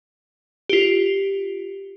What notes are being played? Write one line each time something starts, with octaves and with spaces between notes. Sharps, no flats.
F4 G4